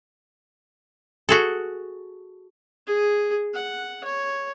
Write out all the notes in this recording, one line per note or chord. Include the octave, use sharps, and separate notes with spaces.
F#4 G#4 A4
G#4
F#5
C#5